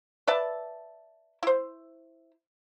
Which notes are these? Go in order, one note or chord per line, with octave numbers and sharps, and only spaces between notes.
B4 D5 E5 A5
E4 C5